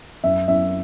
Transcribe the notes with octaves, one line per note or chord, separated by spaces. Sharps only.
F#2 E5
F#2 E5